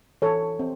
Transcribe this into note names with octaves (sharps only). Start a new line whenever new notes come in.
E3 A4 C#5
C4